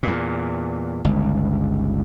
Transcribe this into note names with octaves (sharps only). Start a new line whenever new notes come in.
E2 A#2
G1 C#2